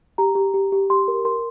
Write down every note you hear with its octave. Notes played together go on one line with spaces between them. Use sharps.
G4 A#5
G4
G4
G4
G4 C6
A#4
A#4 C6